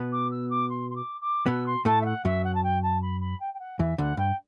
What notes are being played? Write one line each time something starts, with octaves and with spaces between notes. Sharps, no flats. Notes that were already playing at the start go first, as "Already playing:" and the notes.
Already playing: B2 B3
D6
E6
D6
C6
C6
D6
D6
B2 B3 E6
C6
A2 A3 A5
E5
F#5
F#2 F#3 E5
F#5
A5
G5
A5
B5
B5
G5
G5
F#5
E2 E3 E5
D2 D3 F#5
G2 G5